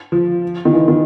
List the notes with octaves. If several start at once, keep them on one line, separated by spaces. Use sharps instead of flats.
F3
D#3
E3
D#3